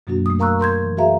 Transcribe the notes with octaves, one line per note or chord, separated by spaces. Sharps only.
F#2 B2 F#3 A#3 D4 F#4
A3 D#6
A#4 F5 A#5 C#6 E6 F#6
A#4 C6 G6 G#6
E3
F#4 G#4 B4 E5 F5 A#5